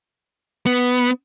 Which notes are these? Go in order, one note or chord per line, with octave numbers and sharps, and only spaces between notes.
B3